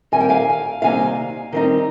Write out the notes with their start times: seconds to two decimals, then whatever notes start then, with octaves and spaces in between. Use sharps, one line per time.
0.12 D#3 G3 C4 G#5
0.20 G5
0.29 F5 G#5
0.82 C3 D#3 G3 A#3 D#4 F5 G#5
1.52 D#3 G3 C4 D#4